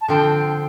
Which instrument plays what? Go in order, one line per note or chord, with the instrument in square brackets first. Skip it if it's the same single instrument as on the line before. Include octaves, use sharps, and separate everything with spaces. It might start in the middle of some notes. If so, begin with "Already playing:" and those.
[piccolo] A5
[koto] D3 F3 C4 [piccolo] G5